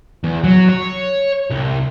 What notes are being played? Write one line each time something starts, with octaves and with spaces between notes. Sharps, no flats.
E2
F#3
C#5
C2